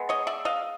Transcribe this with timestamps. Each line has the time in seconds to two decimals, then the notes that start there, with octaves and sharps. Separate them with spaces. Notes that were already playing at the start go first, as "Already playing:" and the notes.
Already playing: G#3 B3
0.09 C#5 D#5
0.27 D5 E5
0.45 D#5 F5